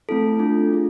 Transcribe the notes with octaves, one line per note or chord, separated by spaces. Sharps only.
A3 C4 E4 A4
A3 D4 F4
A3 D4 F4 G#4